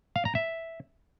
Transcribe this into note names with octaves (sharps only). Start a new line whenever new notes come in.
F5
A#5
E5